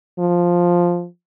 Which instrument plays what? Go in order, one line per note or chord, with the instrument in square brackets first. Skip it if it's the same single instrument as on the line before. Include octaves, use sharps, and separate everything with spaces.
[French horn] F3